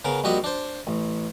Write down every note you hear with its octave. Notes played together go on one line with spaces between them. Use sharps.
C#3 B3 A#4
A#1 G3 F#4 D#5 B5
D4 C5
A1